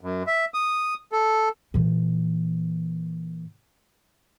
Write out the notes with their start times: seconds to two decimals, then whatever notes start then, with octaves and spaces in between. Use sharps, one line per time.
0.01 F#2
0.27 E5
0.54 D#6
1.12 A4
1.74 A#2 E3